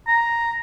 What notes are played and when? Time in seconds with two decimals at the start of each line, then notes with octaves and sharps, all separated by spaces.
0.07 A#5